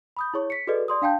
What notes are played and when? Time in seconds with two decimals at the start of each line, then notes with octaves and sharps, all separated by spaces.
0.17 B5 D#6 G6
0.34 E4 G#4 C#5 C#6
0.50 B6 C#7
0.67 F#4 G#4 A4 B4 D5 D#5
0.88 D5 C6 D#6
1.02 D4 F5 G5 A5 G6